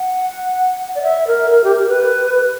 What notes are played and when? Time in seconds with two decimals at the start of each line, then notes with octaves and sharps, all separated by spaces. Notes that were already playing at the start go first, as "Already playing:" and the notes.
Already playing: F#5
0.95 D5
1.02 E5
1.27 A#4
1.51 A#4
1.64 G4
1.75 A#4
1.88 B4